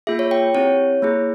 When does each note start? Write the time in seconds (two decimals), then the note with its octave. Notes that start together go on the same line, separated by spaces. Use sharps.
0.07 A#3 F4 G#4 E5
0.19 C#5
0.31 G5
0.55 C4 E4 G4 C#5
1.02 A#3 E4 G#4